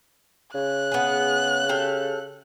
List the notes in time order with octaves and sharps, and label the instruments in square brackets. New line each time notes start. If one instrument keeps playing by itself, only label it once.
[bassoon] C#3 [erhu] F#6
[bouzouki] B3 G#4
G4 A4 F5